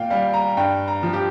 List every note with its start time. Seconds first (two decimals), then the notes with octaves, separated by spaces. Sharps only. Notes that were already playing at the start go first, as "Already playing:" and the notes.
Already playing: A#2 F5 G5
0.10 G3 F5
0.34 A#5
0.57 G2 G5
0.88 A#5
1.03 F3
1.13 G4